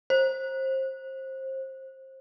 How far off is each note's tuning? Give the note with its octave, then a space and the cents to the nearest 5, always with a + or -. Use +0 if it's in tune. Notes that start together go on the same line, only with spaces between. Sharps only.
C5 +25